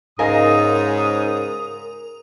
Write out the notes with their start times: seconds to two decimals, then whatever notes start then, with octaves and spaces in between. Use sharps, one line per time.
0.19 G#2 C#3 A#4 D#5 F5 G#5 D#6